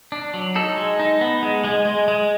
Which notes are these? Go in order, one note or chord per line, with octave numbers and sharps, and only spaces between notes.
D4
F#3
D#4 A4
G#3
D#4
B3
G#3
G#3
G#3
G#3